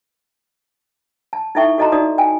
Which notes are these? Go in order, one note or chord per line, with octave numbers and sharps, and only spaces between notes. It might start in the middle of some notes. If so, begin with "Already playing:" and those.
A5
D#4 E4 A4 E5 G5 C#6
F#4 A4 D#5 A5 A#5 C6
D#4 F#4 D5 D#6
G5 G#5